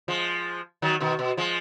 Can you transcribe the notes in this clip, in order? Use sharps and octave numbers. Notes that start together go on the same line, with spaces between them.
F3 G#3
D#3 F#3
B2 D#3
B2
F3 G#3